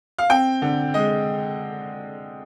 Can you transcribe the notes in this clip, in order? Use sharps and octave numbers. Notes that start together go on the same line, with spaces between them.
F5
C4 G5
D3
G#3 D#5